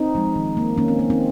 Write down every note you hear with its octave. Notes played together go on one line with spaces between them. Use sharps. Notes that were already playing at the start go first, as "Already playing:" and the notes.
Already playing: C4 D#4
F3 G#3
D#3
A#3
D#3 A#3 C#4
C4
A#3
C4 D#4